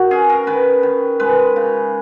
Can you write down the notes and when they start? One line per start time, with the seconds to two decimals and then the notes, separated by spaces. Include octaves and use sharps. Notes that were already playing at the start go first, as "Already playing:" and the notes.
Already playing: D#3 F#4
0.11 C#4 G#4
0.30 A#4
0.47 D#3 B4
0.83 D#3
1.20 G#3 B4
1.56 C#3